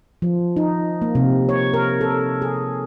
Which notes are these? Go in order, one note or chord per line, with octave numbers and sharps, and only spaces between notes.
F3
D#4
A#3
C3
C#5
A#4
A4
G#4